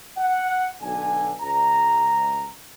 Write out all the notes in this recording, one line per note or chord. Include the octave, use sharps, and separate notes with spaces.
F#5
B1 D3 G#5
C#2 A#5